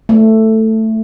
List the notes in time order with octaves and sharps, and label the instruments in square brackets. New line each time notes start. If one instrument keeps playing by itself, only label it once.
[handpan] A3